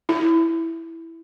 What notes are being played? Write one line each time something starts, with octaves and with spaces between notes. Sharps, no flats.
E4